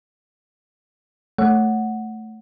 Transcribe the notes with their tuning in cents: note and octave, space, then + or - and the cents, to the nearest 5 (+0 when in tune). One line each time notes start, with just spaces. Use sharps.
A3 +0 C#5 +0 F#5 +0